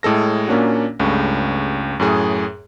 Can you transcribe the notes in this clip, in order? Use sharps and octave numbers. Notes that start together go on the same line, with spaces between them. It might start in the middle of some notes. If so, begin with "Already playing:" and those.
A2 G#3 A4 A#6
A#2 A#3 C#4 D4 F#4
C#2 G2 C#3 A3
F#2 A2 G#4